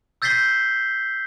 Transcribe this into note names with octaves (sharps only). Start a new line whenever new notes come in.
E6 G6 A6 B6 C7 G7